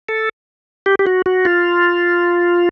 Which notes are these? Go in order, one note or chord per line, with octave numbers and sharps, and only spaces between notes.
A4
G4
G4
F#4
F#4
F4